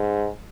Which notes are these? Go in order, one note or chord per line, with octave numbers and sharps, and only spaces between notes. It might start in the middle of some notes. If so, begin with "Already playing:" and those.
Already playing: G#2